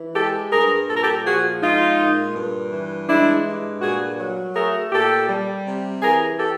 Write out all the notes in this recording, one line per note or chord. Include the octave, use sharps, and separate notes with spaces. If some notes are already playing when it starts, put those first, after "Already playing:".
Already playing: E3
G#3 G4 A4
G2 G#4 A#4
A#2 A4
A#4
G4 A4
F3 F#4 G#4
G#3 D#4 F4
A#2
G2
E3
G#3 D4 E4
G2
A#2 F#4 G#4
F#3
A3 G#4 A#4
A#2 G4 A4
G3
C3
E3 G#4 A#4
G4 A4